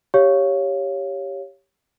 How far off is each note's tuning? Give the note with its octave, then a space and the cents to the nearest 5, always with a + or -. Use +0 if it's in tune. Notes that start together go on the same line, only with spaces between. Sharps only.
G4 +0 C#5 +0 F5 -5